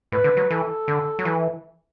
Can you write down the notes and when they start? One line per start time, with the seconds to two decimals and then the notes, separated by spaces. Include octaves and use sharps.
0.12 A2 B4
0.24 D3
0.37 F#3
0.51 E3 A4
0.88 D3
1.19 F#3
1.25 E3